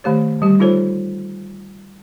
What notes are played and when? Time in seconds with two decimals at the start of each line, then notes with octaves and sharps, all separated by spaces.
0.04 D#3 A3 G4 C#5
0.41 D3 G3 G4
0.60 D#4 F4 A4 C5 C#5